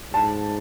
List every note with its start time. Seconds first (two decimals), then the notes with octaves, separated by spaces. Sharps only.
0.13 G#2 A5